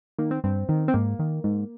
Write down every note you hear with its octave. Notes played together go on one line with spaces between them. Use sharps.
D#3 A#3
C4
G2 C4
D#3
C4
G#2 A#3
D#3
G#2